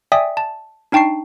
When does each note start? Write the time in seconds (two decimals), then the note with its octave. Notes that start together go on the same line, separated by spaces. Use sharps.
0.12 D5 E5 G5 G#5 D#6 B6
0.37 A5
0.92 D4 D#4 G5 A5 C#6 C7